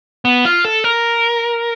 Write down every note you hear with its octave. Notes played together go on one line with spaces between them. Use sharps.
B3
F4
A4
A#4